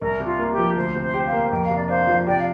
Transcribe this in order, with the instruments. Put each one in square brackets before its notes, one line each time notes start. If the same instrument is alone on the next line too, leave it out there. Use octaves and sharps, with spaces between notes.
[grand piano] C2 [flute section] A#4
[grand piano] C3
[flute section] F4
[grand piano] A#3
[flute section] G4
[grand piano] F3
[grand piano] D2 [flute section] C5
[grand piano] C3
[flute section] C5
[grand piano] G4
[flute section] C5 F5
[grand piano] A#3
[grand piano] F2 [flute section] G5
[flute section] F5
[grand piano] C3
[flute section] D5
[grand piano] D4 [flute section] C5 F5
[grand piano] F3
[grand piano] C3 [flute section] D5 G5
[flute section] F5